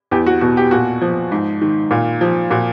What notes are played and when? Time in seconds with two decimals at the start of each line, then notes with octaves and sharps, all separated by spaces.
0.11 E2 G4
0.27 F#4
0.41 B2 F#4
0.57 G4
0.71 A#2 F#4
1.01 F3
1.32 G#2
1.61 D#3
1.91 A#2 F4
2.21 F3
2.50 A#2 F#4